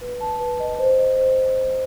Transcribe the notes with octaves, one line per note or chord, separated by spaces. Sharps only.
B4
A5
B4
D#5
C5
D#5
C5